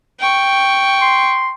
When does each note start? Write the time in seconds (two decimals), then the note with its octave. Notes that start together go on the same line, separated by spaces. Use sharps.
0.19 G5 C#6
1.01 C6